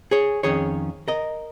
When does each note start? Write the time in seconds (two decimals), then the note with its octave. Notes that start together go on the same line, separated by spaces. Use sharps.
0.11 G#4 C#5
0.43 F2 D#3 C#4 G#4 C#5
1.08 A#4 D#5